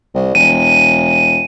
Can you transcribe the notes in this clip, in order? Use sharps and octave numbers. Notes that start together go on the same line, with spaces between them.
C2
E1 D#7